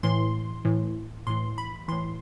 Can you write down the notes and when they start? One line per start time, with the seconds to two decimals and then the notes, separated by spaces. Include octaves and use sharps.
0.03 A2 E3 C6
0.65 A2 E3
1.27 A2 E3 C6
1.58 B5
1.88 A2 E3 C6